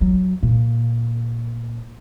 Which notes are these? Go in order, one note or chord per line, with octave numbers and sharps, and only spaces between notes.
F#3
A#2